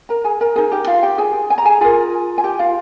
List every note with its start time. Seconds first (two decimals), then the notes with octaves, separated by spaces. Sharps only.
0.09 A#4 A#5
0.24 G#4 G#5
0.41 A#4 A#5
0.56 D#4 G#4 A#4 G#5
0.72 G4 G5
0.87 F4 F5
1.03 G4 G5
1.18 G#4 G#5
1.50 G#5
1.58 A#5
1.65 G#4 G#5
1.81 F4 G#4 A#4 G#5
2.38 G#5
2.44 G4 G5
2.59 F4 F5